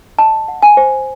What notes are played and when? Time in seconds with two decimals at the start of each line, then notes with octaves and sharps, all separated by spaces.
0.19 D#5 A5
0.48 F#5
0.63 G#5
0.77 C5